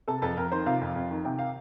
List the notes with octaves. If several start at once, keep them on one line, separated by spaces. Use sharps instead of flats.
C3 A4 A5
F2 A4 A5
F2 A#4 A#5
D#3 C5 C6
C3 F4 F5
F2
F2
D#3
C3 G5
F5